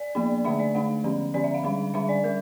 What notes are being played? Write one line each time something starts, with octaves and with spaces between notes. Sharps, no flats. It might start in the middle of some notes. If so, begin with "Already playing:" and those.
Already playing: D5
F3 A#3 D4
D3 A3 D4 E5
D5
D3 A3 D4 F5
D3 F3 C#4
D3 F3 C#4 D5
E5
F5
D3 G3 D4
D3 G3 D4 E5
D5
G3 A#4